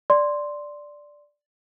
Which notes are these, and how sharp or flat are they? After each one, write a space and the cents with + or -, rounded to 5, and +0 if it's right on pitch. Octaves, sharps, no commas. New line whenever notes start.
D5 +0 C6 +0